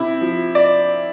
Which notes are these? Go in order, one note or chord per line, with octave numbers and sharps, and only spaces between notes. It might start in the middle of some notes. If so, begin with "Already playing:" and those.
Already playing: C3 E4
F3
D5